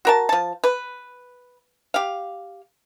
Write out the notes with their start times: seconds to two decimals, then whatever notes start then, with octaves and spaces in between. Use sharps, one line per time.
0.05 F#4 A#4 A5
0.29 F3 A5
0.64 B4
1.94 G4 F5